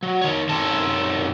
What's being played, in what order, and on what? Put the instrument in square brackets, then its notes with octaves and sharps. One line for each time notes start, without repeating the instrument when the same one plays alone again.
[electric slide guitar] F#3
D#3 C#5
F#2 C3 D#3 C#4 A4 A5